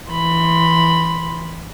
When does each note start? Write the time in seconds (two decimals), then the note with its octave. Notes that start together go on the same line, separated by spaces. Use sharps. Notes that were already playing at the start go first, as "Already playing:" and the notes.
0.10 E3 B5 C6